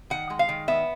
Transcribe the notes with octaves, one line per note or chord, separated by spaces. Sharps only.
D#3 F#5
G#3
F5
D#3
B3 E5